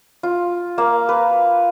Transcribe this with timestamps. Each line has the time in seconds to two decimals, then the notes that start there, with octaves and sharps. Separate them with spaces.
0.23 F4
0.78 A#3 F5
1.09 B4